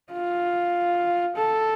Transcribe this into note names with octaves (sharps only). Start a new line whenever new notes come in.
F4
A4